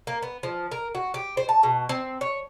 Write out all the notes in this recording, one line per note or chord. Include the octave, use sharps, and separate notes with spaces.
A#3
B3
F3
A#4
F#4
G4
C5
A5
B2
C4
C#5